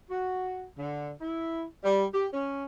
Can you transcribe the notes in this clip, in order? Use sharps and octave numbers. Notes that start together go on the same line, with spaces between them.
F#4
D3
E4
G3
G4
C#4